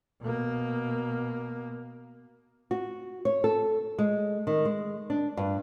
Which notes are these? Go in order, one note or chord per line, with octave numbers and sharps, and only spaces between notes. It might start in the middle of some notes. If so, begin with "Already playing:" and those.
B2 A#3
F#4
C#5
A4
G#3
D#3
G#3
D4
G2